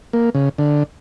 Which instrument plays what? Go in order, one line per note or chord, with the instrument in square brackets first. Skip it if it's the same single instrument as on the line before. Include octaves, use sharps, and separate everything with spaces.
[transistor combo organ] A#3
C#3
D3